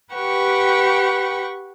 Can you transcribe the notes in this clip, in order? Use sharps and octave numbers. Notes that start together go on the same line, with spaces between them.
G4 B4 F#5 G5 C#6